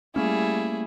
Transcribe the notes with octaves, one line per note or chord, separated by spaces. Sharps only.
G3 A3 A#3 C#4 E4 G#4